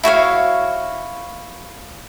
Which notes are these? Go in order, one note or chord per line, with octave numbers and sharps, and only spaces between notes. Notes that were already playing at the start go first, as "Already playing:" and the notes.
E4 F#4 C#5 F5